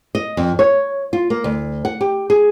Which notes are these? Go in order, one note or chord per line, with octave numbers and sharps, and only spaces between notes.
D#5
F2
C#5
F4
A#3
D2
F#5
G4
G#4